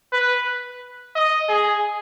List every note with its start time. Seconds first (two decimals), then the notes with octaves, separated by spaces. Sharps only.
0.12 B4
1.15 D#5
1.48 G#4